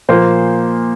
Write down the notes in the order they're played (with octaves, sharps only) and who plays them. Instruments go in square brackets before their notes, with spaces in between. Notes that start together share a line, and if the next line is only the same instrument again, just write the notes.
[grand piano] A#2 F3 A#3 C5